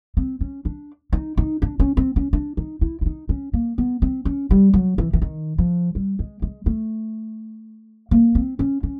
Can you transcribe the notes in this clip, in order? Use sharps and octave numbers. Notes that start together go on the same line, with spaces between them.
C4
C#4
D4
D#4
D#4
D4
C#4
C4
C#4
D4
D#4
E4
E4
D#4
C#4
A#3
B3
C4
C#4
G3
F#3
E3
E3
D#3
F3
G3
G#3
G#3
A3
A#3
C4
C#4
C#4